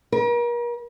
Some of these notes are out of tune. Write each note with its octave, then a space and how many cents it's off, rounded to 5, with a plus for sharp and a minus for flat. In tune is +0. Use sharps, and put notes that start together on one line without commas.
A#4 +40